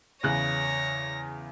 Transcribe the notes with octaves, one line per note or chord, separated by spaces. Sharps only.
E2 C#3 C#5 F#6 A#6